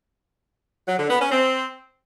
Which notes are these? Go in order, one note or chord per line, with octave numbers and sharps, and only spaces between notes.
F#3
D3
B3
C#4
C4